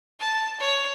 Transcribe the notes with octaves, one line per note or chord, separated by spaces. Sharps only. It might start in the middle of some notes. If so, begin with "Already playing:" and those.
A5
C#5